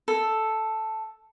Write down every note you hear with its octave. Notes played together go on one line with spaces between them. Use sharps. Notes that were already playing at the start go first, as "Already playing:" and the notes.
A4